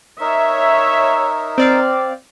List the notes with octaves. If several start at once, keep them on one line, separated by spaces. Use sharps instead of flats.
D#4 A#4 C#5 E5
C4 D5 F5